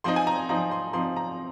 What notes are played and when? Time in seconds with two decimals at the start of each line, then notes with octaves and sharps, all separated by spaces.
0.04 F3 C4 D#4 C6
0.16 G#5
0.27 A#5
0.49 F3 C4 D#4 A#5
0.71 C6
0.93 F3 C4 D#4 C6
1.16 A#5